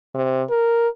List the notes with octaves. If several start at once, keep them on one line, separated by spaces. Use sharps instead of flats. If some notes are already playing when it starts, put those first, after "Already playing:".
C3
A#4